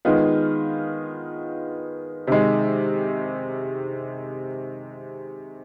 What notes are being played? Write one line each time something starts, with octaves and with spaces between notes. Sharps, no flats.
D#3 G#3 B3 F4
C3 D#3 G#3